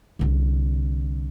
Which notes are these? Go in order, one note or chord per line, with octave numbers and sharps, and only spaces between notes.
C2 D3